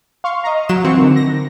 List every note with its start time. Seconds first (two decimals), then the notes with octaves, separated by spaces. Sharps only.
0.24 F5 C6 C#6
0.44 D#5 F5 A#5
0.69 F#3 E7
0.85 E3 C4 F#4 C#7
0.97 D3 D#3
1.16 A#6